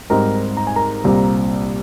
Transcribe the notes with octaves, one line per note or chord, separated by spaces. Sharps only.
G#2 G3 C4 A#4 A#5
A#5
G#5
A#4 A#5
C2 A#2 G3 C4